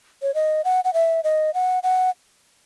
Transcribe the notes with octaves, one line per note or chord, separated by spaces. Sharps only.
C#5
D#5
F#5
F#5
E5
D#5
F#5
F#5